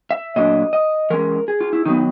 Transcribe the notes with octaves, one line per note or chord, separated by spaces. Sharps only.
E5
A#2 F#3 A3 D4 D#5
D#5
E3 G#3 C#4 A#4
G#4
F4
E4
D#3 F#3 B3 D#4